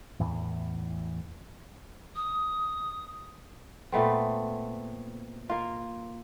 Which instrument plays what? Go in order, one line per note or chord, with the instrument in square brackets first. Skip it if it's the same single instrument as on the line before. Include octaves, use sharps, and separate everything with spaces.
[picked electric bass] E2 A2 E3
[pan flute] D#6
[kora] A#2 A3 B3 C4
A#3 F4